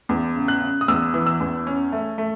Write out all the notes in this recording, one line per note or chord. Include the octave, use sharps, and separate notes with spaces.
E2
C#3
F#6
C#3
D#6
E2 E6
E3
E6
E2
C#4
A3
A3